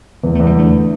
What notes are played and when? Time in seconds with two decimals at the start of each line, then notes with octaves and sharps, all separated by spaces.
0.23 E2 B3
0.35 E2 A3
0.47 G3
0.56 D3 A3